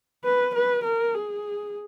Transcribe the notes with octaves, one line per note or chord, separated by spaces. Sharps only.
B4
B4
A#4
G#4